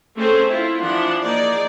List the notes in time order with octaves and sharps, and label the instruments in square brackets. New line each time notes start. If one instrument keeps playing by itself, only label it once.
[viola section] A3 C4 C#4 G#4 A4 C5
E4 F4
E3 F3 D4 F#5
A#3 D#4 G#4 D5